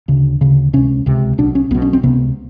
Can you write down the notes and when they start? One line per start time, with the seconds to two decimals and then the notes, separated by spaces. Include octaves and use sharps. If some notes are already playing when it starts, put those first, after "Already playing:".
0.08 D2 C#3
0.41 D2 C#3
0.73 C#2 C3 C#4
1.06 C#2 C3
1.38 B1 B2 D4
1.55 C#4
1.71 B1 B3
1.75 B2
1.82 C#4
1.93 C4
2.03 C#2 C3 B3